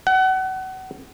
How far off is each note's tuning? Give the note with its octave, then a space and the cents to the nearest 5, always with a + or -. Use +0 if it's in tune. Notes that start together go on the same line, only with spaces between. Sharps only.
F#5 +30